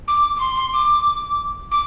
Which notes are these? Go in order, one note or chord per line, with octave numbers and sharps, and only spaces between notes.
D6
D6
C6
C6
D6
D6